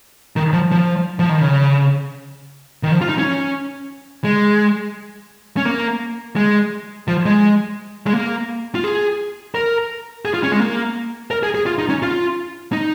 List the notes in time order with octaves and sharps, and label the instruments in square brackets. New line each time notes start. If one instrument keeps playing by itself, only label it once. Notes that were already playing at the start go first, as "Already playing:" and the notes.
[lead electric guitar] D#3
F3
F3
F3
D#3
C#3
D#3
F3
F4
D#4
C#4
G#3
C#4
A#3
G#3
F3
G#3
G#3
A#3
F4
G#4
A#4
G#4
F4
C#4
G#3
A#3
A#4
G#4
G#4
F4
D#4
C#4
F4
D#4